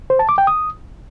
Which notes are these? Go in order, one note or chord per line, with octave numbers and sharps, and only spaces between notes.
C5
A5
D6
G5
D#6